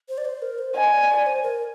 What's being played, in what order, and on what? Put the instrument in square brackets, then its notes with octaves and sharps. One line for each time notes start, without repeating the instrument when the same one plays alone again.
[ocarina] C5
D5
C5
A#4
C5
[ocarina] D#5 [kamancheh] G#5
[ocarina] D5
D5
C5
A#4